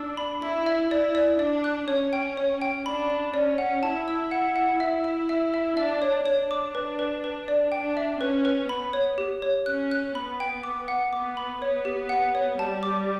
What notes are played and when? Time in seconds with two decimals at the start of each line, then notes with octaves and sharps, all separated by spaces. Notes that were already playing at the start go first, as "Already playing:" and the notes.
Already playing: D4 E6
0.17 B5
0.42 E4 B5
0.66 E5
0.91 E4 D5
1.15 D5
1.39 D4 D5
1.64 F#6
1.88 C#4 C#5
2.13 G5
2.37 C#5
2.62 G5
2.85 D4 B5
3.10 B5
3.34 C#4 D5
3.58 F#5
3.83 E4 A5
4.08 E6
4.31 F#5
4.56 F#5
4.80 E4 E5
5.04 E5
5.29 E5
5.54 E5
5.77 D4 E5
6.02 C#5
6.26 D4 C#5
6.51 D6
6.75 B4
6.99 B4
7.24 B4
7.48 D5
7.72 D4 G5
7.97 E5
8.21 C#4 B4
8.45 B4
8.69 B3 B5
8.93 C#5
9.18 G4
9.42 C#5
9.66 C#4 F#6
9.91 F#6
10.15 B3 B5
10.40 G5
10.63 D6
10.88 F#5
11.13 B3 D6
11.37 B5
11.61 B3 C#5
11.85 G4
12.09 F#5
12.35 C#5
12.59 G3 A5
12.83 D6